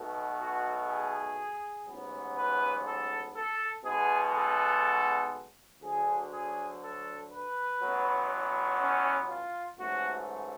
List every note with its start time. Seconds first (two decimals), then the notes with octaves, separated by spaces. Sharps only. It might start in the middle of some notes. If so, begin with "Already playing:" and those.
Already playing: B1 B2 A3
0.38 F#4
0.88 G#4
1.86 A1 G#2 F#3 B3
2.36 B4
2.86 A4
3.35 A4
3.84 B1 B2 G#3 B3 G#4
4.34 A4
5.82 D2 D3 F#3 G#4
6.32 G#4
6.81 A4
7.31 B4
7.80 A1 A2 F#3 B3
8.80 C#4
9.28 F4
9.78 A1 G#2 F#3 A3 F#4